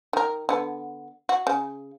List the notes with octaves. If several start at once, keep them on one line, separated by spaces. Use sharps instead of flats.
D#3 A#4
D3 B3
F#4
C#3